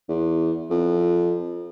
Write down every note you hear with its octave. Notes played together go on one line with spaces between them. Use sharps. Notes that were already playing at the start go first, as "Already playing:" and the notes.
E2
F2